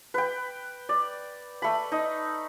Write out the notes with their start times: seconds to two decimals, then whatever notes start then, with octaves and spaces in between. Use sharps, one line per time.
0.14 B4 G5
0.89 D5
1.62 A3 B5
1.92 D#4